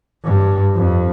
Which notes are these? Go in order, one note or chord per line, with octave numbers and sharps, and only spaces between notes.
G2
F2